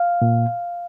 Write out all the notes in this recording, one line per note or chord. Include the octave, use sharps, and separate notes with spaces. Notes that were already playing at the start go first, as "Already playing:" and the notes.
Already playing: F5
A#2